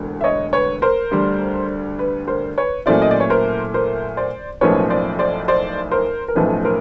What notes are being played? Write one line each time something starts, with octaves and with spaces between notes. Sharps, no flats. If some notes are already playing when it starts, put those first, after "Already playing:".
Already playing: E1 D2 D3
E5
C#5 D#5
B4 C#5
A#4 C5
D2 D3 G3
B4
A#4 C5
B4 C#5
A#2 F#3 A3 C#4 E4 C5 D5
D#5
D5
C#5
A#4 C5
A#4 C5
C5 D5
B1 A2 F3 A#3 C#4 B4 C#5
C5 D5
C5 D5
C5 D5
A#4 C5
A#4
B1 A2 F3 A3 C#4 B4
A#4 C5